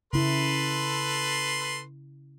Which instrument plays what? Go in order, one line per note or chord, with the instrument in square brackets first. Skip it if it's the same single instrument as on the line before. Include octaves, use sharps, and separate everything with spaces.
[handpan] C#3 E4 [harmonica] A4 B4 C6